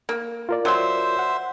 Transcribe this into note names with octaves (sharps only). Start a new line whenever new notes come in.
A#3
F4 A#4 D5
F#3 C5 E5 C6
F#5